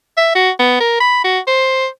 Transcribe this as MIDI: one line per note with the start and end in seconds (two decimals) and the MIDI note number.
0.17 0.31 76
0.35 0.51 66
0.59 0.77 59
0.80 0.96 70
1.00 1.21 83
1.24 1.39 66
1.47 1.87 72